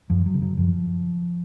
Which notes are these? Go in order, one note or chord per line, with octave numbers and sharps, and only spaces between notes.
F#2 F3
F#3
C#3
F#3
F#2 F3